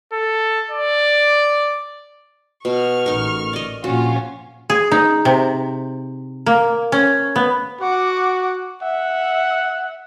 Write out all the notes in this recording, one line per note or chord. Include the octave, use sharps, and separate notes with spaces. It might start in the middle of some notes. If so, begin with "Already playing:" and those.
A4
D5
B2 C#6 F6
A1 D#4 A#4
D5 D#5
A#1 C#4 F4 F#4
G#4
D#4
C3
A#3
C#4
B3
F#4 F#5 D6
E5 F#5